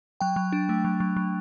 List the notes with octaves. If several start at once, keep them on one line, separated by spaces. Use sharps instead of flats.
F#3 G5
F#3
D4
A3
F#3
F#3
F#3